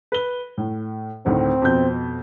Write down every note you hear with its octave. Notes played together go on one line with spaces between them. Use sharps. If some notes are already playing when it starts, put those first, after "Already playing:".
B4 G7
A2
D2 A2 D#3 C4
F2 B2 G6